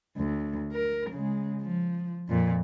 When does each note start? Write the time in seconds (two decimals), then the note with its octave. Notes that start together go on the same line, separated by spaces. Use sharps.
0.17 D2
0.73 A#4
1.10 C#3 G#3
1.62 F3
2.29 F2 A#2